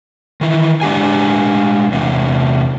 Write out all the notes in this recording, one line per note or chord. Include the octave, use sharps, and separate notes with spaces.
D#3 E3
G#3 D4 G4 G#5
E2 C3